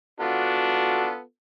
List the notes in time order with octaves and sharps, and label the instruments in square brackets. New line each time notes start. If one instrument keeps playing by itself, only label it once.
[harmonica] B3 F4 A4 [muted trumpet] D4 [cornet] F#4